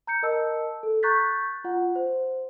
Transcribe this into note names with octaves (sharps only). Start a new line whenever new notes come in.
A#5 G6 C#7
A#4 D#5 A5 E6
A4
A#5 C#6 F#6 G6 A6 B6
F4 F#5
C5